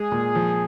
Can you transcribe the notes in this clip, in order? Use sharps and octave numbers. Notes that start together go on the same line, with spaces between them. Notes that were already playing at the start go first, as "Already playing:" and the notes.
Already playing: G#3 G#4
A#2
F3